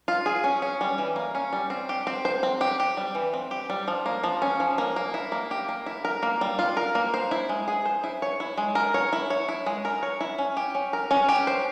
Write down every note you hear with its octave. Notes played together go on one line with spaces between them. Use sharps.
F4
G#4
C#4
C#4
G3
E3
A#3
C#4
G3
C4
G4
C4
C5
C4
G4
G4
G3
E3
C4
G4
G3
F3
A#3
F3
C#4
F3
A#3
A#3
E4
A#3
G4
A#3
E4
A#4
A#3
G3
F4
A#4
A#3
C5
E4
G#3
G#4
C5
E4
C#5
E4
G#3
A#4
C#5
E4
C#5
E4
G#3
A#4
C#5
E4
C#4
G4
C#4
A#4
C#4
G4
C5